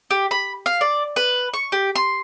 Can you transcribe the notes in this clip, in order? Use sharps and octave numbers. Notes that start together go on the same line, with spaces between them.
G4
B5
F5
D5
B4
C#6
G4
C6